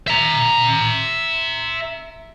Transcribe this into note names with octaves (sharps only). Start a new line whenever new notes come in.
E5 A#5